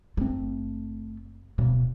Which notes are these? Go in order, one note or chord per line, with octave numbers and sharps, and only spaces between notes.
F#1 A3 C4
D1 B2